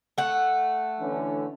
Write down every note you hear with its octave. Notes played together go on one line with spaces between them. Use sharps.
A3 F#5
D3 E3 C#4